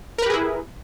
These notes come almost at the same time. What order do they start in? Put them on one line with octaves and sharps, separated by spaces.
A#4 B4 G4 G#4 E4